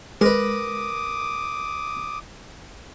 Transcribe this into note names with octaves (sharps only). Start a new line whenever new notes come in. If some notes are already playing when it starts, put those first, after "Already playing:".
G#3 A#4 B4 D6 D#6